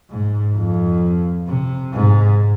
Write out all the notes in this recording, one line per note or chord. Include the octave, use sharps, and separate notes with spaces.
G#2
F2
C3
G#2